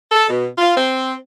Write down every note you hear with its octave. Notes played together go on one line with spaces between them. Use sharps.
A4
B2
F4
C4